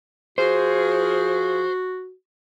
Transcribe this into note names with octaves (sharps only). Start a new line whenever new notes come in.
F3 F#4 G#4 C5